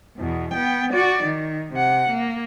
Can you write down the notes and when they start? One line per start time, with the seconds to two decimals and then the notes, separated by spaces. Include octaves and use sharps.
0.18 E2 B2
0.54 B3 G5
0.93 F#4 D5
1.24 D#3
1.74 C3 F#5
2.10 A#3